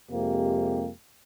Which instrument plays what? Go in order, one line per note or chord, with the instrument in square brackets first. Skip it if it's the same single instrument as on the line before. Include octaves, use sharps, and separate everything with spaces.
[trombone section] F2 C3 G#3 A#3 G4